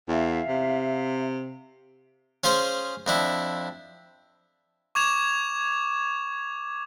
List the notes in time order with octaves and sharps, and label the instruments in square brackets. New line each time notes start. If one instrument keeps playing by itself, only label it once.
[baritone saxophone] E2 [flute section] E5 F5
[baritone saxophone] C3
[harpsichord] C#4 F4 G#4 C5
F2 D4 E4
[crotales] C#6 D6 G#6 E7 F7